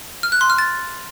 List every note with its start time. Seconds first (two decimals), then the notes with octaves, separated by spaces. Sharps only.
0.23 F6
0.32 F#6
0.41 C6
0.50 F6
0.58 A6